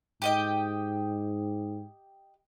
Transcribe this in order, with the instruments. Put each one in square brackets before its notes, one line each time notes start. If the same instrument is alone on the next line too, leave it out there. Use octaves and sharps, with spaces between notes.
[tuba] G#2 [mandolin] G4 D#5 G5